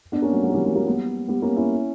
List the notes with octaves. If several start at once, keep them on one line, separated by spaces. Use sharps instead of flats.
B3 D4
A#3 C#4
F#3
F#3
A#3
E3 G3
F#3 A#3
F#3 A#3
G3 B3
G3 B3
A#3 C#4
C#4 E4